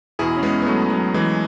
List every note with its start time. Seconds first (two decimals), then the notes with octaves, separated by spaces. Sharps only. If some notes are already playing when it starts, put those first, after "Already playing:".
0.19 E2 B2 E4 G#4
0.37 C#4
0.43 G#3 B3
0.62 B3
0.67 F#3 A3
0.90 F#3
1.14 E3 G#3